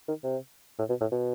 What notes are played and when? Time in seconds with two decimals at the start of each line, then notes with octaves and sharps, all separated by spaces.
0.08 D#3
0.24 C3
0.79 A2
0.89 B2
1.01 A2
1.12 B2